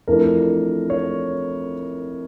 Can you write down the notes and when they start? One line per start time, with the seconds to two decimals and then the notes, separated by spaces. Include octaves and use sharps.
0.07 F2 E3 A3 D4 A#4
0.90 C#5